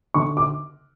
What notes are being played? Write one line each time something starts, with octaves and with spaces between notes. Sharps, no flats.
D3 C#6
D6